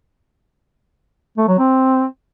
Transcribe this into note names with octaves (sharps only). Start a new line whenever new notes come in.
A3
F#3
C4